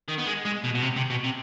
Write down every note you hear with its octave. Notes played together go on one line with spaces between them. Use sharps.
D#3
B3
G#3
G#3
B2
B2
C3
C3
B2
C3